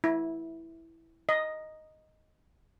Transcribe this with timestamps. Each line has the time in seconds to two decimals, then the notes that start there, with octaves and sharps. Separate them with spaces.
0.04 E4
1.29 D#5